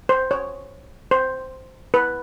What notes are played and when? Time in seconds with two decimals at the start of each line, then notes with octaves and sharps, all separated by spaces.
0.09 C5
0.31 C#5
1.11 C5
1.94 B4